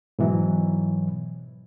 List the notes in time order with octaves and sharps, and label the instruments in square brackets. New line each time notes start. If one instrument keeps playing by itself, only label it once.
[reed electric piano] G#2 B2 E3 F#3